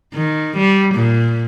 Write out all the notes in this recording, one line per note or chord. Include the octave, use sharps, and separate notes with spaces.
D#3
G3
A#2